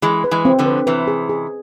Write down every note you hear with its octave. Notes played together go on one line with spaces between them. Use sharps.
E3 G#3 G#4
B4
E3 G#3
C4
D3 F3
B4
C3 E3 B4
G#4
G#4